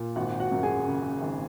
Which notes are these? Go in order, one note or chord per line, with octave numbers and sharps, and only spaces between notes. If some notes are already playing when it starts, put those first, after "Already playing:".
Already playing: A#2
G#1 F#4 F#5
F#4 F#5
F#2
G#4 G#5
C#3
G#1